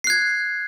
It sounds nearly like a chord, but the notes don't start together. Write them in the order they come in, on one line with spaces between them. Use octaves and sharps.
C7 F#6 G#6